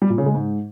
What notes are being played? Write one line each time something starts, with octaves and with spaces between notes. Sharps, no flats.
G3
A#2
C#3
G#3
G#2